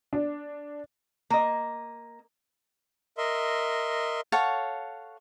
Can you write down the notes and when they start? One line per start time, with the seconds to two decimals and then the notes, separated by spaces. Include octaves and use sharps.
0.13 D4
1.30 A#3 D#5
3.18 A#4 D#5 E5 C6
4.32 A4 C#5 F5 F#5